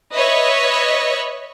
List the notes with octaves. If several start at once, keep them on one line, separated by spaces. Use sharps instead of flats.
B4 C#5 D#5 E5 B5 C#6